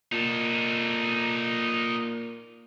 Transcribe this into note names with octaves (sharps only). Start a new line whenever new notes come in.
A#2 D#4 A4